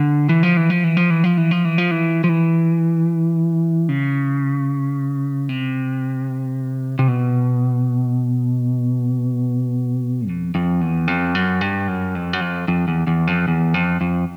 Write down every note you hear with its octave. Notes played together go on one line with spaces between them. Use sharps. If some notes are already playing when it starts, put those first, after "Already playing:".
Already playing: D3
E3
F3
E3
F3
E3
F3
E3
F3
E3
F3
E3
F3
E3
F3
E3
C#3
C3
C3
B2
F2
F2
E2
F2
F#2
G2
F#2
F2
F#2
F2
F2
E2
E2
F2
E2
F2
F2